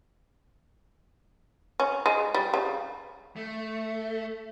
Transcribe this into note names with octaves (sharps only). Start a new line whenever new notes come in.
C#4
G#3
G3
C#3
A3